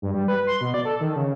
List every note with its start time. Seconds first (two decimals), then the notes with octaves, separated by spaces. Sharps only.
0.02 G2
0.14 G3
0.28 B4
0.47 C6
0.61 B2
0.74 D5
0.85 A4
1.00 D#3
1.16 C#3